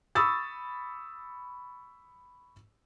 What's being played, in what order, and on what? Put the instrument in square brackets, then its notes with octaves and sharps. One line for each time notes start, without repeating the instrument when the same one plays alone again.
[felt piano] B5 C#6 D#6 E6 A6